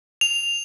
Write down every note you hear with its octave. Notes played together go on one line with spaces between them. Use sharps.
F7